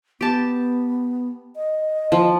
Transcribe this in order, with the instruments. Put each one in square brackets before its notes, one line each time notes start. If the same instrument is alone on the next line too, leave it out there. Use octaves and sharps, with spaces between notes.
[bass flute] B3 [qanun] G4 A5
[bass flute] D#5
[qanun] F3